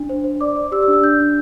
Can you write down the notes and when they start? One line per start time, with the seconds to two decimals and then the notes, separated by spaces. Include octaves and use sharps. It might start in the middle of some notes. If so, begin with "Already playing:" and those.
Already playing: D4
0.09 C5
0.24 C5
0.41 D5 D6
0.56 D5
0.72 G4 E6
0.83 E6
0.88 D4
0.93 E6
1.03 D4 G6
1.20 D4